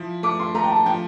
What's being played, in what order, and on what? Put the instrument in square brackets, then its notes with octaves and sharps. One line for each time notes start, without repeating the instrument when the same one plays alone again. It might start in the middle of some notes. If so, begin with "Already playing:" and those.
Already playing: [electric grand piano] F3 E4
[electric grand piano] A3 [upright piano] D6
[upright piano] C6
[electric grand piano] A3 [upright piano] A#5
[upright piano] G5
A5
[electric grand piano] F3 [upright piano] G5